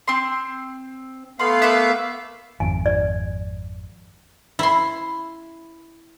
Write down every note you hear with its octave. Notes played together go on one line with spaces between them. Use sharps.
C4 C6
A3 B3 F5 B5 C6
A#3 B4 E5
G#1 F2 G#5
D5
E4 C6